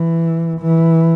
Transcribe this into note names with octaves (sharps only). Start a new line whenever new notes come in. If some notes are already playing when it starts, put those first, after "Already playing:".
Already playing: E3
E3